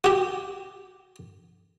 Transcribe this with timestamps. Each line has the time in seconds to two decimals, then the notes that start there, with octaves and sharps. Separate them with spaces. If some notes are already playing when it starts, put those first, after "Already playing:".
0.04 F#4 G4